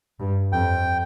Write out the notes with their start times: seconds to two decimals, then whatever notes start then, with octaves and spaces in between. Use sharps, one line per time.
0.20 G2
0.52 F2 G5